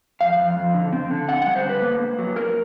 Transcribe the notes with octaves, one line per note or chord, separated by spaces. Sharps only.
F2 F5
F2
F2
D3
C4
D3
C4 F#5
G3 F#5
C5
D3
B4
A#3
A#3
F#3
F#3 A#4